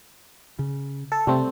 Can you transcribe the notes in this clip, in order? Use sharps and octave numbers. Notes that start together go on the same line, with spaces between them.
C#3
A4
C3 G3 A3 C4